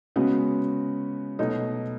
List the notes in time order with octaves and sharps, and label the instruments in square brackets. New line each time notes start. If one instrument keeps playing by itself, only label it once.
[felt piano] C#3 G#3 B3 F#4
B2 F#3 A3 D#4